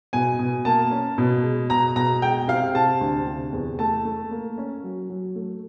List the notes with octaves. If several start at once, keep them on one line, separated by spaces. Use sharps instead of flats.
B2 G#5
B2
A#3 A5
C#4
B2
G#3
B2 A#5
B2 A#5
G#3 G5
C3 F5
C3 A5
D2
C3
E2
A3 A5
A3
A#3
C#4
F#3
F#3
A3